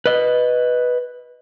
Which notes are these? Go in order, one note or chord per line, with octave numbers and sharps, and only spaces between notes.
B4 D#5